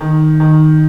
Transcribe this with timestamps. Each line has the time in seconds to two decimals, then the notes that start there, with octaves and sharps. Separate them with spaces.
0.01 D#3
0.40 D#3